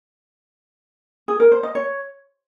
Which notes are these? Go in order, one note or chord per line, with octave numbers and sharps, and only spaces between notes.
G#4
A#4
C5
D#5
C#5